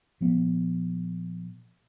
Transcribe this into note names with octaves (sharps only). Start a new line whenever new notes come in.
A#2 F3 B3